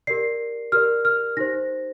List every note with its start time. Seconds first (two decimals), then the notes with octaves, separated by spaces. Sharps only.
0.07 G4 A#4 D5 C7
0.72 G4 A#4 D5 F6
1.05 F6
1.37 D#4 G4 C5 A#6